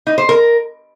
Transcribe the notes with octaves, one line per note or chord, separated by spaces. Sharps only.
D#4
C5
A#4